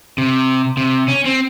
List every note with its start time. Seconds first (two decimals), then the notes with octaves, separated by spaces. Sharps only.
0.18 C3
0.77 C3
1.08 C#4
1.25 C4